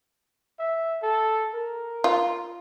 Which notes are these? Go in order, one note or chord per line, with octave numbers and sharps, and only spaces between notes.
E5
A4
A#4
F4